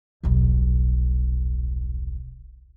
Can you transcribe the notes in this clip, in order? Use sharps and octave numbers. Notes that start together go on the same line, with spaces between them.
D#1 B1